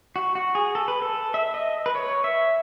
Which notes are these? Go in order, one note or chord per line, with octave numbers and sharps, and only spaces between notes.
F#4
F#4
G#4
A4
B4
A4
E5
D#5
B4
C#5
E5